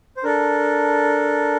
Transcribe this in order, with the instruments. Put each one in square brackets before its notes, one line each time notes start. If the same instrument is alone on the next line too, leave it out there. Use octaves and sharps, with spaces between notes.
[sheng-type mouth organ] C5
D4 A4 A#4